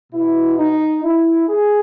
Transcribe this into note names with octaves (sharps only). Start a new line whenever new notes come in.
B2 E4
D#4
E4
G#4